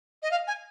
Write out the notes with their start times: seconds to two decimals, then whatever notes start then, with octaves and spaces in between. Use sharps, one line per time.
0.22 D#5
0.31 F5
0.47 G#5